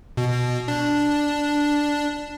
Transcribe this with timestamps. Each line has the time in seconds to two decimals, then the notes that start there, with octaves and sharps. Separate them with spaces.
0.17 B2
0.68 D4